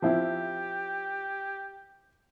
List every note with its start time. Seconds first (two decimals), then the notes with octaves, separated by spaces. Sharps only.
0.02 F3 C4 E4 G4